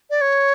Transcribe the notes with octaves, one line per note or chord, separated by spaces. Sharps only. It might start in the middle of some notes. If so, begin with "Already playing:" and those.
D5
C#5